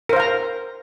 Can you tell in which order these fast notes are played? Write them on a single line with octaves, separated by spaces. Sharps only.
A#4 C5 F5 A#5